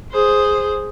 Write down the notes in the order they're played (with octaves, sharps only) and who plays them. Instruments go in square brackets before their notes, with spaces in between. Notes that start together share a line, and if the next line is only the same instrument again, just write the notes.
[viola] G#4 C5